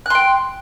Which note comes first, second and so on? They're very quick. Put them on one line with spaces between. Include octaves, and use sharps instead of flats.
F#6 C6 G5